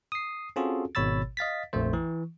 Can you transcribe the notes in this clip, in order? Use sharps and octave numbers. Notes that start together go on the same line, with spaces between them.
D#6 C7
C4 C#4 F4 F#4 G#4 A4
G#1 B2 C#5 B5 E6 A6
D#5 F5 A6 B6
A#1 F2 A3 C5
E3